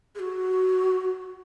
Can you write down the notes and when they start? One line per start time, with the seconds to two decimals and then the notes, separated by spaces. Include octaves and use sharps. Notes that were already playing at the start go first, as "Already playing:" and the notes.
0.15 G#4
0.19 F#4